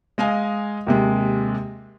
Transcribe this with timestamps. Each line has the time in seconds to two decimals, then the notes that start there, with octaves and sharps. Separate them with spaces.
0.18 G#3 D#5 F5 G#5
0.87 D#2 C3 G#3